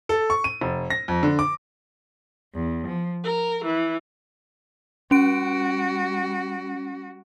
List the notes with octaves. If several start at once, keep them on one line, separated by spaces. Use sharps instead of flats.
A4
C#6
D#7
F1
A#6
F2
D3
D6
E2
F3
A#4
E3
G3 C#4 F#4 D7